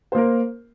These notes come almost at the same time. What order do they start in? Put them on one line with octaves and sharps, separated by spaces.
C5 A#3 A#4